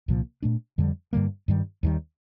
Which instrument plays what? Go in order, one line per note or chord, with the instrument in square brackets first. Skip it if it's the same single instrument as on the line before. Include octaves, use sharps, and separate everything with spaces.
[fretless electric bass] C2 A#2 F3 A#3
A#2 A3 D4
F2 D3 G3
G2 D3 G3 A#3
G2 D#3 G3
D#2 D#3 G3